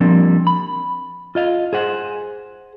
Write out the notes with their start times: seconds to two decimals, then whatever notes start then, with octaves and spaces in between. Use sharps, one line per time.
0.01 F3 G3 A#3 C4 D4
0.47 B5
1.35 F4 D#5 F5
1.73 G#4 C5 F#5